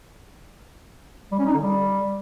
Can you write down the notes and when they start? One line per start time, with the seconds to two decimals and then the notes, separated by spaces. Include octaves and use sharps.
1.32 G3
1.39 C#4
1.46 D#4
1.54 D3
1.61 G3